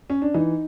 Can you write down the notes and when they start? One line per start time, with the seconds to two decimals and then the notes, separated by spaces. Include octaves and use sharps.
0.10 C#4
0.22 D4
0.34 E3 D#4